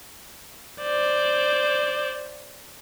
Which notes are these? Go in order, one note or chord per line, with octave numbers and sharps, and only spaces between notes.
C5 D5